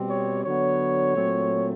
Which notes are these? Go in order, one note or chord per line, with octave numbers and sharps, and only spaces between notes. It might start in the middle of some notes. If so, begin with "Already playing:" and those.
Already playing: B2 G3 C4
C#5
D3 F#3 B3 C#5
A#2 F#3 A3 C4